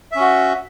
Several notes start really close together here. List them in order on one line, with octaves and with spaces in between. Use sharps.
E5 C#4 F#4